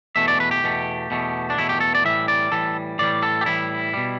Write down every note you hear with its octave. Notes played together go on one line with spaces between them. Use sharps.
E2 B2 A3 E5
D5
B4
G4
E2 B2 A3
E2 B2 A3
D4
E2 B2 A3 E4
G4
A4
D5
A2 E3 G3 E5
D5
A2 E3 G3 A4
A2 E3 G3 D5
A4
G4
A2 E3 G3 E4
B2 G3